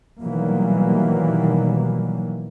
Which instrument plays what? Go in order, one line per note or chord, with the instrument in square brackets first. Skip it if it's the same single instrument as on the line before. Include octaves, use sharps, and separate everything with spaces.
[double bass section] B2 D#3 E3 F#3 G3 A#3